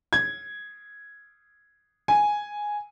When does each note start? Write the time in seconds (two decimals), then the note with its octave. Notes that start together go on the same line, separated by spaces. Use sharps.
0.13 G#6
2.08 G#5